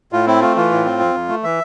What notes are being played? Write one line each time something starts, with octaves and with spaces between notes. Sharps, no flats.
A2 F4
C4 E4
A3 F4
E3 F4
A2
C4
F2
F2
A3
E3 E5